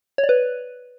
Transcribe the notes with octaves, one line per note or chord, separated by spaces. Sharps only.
C#5
D5
B4